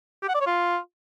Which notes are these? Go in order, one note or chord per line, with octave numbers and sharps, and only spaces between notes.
G4
F#5
D5
C#5
F4